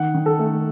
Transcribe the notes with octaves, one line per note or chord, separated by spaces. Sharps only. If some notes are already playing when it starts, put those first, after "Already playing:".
Already playing: D#3 F#5
D#3
A4
A3